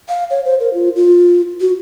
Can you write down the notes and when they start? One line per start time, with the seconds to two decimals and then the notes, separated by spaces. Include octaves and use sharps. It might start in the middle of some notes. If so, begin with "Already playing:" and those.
0.09 F5
0.30 C#5
0.45 C5
0.60 A#4
0.74 F4
0.96 F4
1.61 F#4